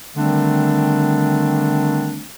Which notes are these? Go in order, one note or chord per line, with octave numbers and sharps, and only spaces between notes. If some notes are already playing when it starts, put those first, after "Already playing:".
D3 D#3 G3 A3 C4 D4